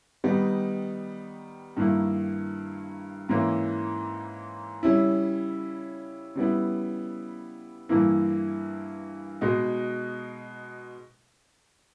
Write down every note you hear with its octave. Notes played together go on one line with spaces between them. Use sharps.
D#3 G3 B3 D#4
G2 D#3 A#3 E4
G#2 E3 A#3 C#4 E4
C#3 G3 C#4 E4
C#3 G3 B3 E4
G2 E3 A#3 E4
B2 G#3 D#4